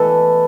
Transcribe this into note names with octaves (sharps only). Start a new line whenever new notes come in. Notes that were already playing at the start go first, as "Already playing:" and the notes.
Already playing: B2 E3 A3 A4 B4